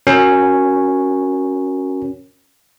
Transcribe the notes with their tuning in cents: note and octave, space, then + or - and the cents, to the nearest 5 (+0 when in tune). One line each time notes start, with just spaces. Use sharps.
C#4 -5 F#4 +0 A#4 +0